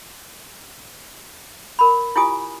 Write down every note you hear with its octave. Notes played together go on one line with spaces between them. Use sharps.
A#4 B5
E4 F4 G4 G#5 D#6